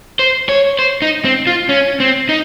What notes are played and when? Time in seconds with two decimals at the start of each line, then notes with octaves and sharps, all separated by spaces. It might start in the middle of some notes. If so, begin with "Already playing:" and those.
0.19 C5
0.49 C#5
0.79 C5
1.02 D#4
1.25 C4
1.47 F4
1.69 C#4
2.00 C4
2.29 D#4